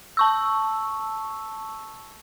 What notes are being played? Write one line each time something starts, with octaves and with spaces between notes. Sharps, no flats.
A5 C#6 E6